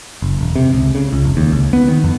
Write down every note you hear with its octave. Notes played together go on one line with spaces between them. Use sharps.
F#1
E1
C3
C#2
C#3
C#2
F1
D#2
C#2
B3
D#3
F2